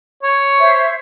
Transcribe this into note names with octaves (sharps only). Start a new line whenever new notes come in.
C#5
C5 E5 G#6